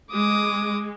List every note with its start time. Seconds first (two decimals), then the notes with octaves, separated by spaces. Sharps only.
0.12 G#3 D6 D#6